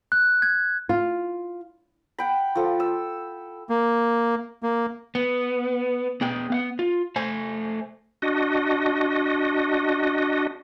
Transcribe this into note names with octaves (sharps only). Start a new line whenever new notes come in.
F#6
G#6
F4
F#5 G5 B5
F3 A4
E6
A#3
A#3
B3
B3 G#4 G5
B3 F5 F#5
F4
A3 C5 G#5
D4 F#4 D#5